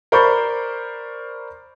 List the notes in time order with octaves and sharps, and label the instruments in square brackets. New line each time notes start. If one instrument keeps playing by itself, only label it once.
[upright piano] A#4 C5 D5 B5 C#6 G6